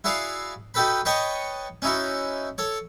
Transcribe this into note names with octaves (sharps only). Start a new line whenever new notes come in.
E4 F#4 G#4 D5 F5
D#4 F#4 G4 A4 B4 B5
B4 C#5 D#5 G5 A5 C#6
C#4 D#4 E4 F#4
A4 C#5